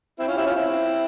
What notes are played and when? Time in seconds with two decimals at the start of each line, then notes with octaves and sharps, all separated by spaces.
0.19 C4 E4
0.28 C#4 F4
0.37 E4 G4
0.46 C#4 F4
0.54 C4 E4